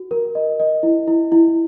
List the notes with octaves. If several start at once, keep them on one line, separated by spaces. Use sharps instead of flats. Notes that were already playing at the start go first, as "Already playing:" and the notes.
Already playing: F#4
A#4
D#5
D#5
E4
E4
E4